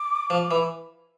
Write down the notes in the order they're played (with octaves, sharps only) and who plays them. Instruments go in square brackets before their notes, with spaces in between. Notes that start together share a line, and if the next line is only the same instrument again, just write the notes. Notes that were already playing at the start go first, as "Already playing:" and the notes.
Already playing: [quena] D6
[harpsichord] F3
E3